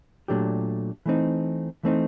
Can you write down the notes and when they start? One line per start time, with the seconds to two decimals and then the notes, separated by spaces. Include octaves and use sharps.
0.28 A#2 F#3 A3 D4 G4
1.06 E3 A3 C4 D#4
1.83 E3 A3 C4 D#4